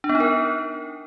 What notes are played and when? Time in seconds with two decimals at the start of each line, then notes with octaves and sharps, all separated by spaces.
0.04 D4
0.09 B3
0.15 D#4
0.20 A#4